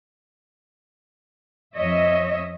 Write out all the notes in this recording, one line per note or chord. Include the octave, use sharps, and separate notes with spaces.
F2 C#5 D#5 E5